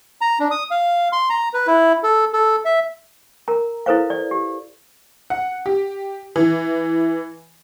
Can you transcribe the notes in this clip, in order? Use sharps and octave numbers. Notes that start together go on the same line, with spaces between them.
A#5
D4
D#6
F5
C6
A#5
B4
E4
A4
A4
E5
A#4 A#5
E4 A4 B4 C5 F5
D5
G4
F#5
G4
E3